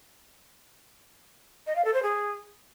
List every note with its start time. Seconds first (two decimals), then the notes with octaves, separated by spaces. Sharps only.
1.67 D#5
1.76 F5
1.85 A4
1.94 C5
2.03 G#4